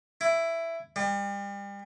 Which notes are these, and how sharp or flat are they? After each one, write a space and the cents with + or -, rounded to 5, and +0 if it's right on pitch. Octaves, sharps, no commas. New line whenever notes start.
E4 +10
G3 +35